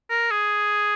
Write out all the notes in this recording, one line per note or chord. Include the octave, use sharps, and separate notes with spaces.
A#4
G#4